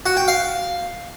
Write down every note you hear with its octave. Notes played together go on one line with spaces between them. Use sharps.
F#4
G5
F5